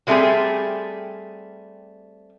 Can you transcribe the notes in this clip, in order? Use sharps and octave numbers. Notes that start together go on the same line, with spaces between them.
F#3 G3 A3 C4 G4 G#4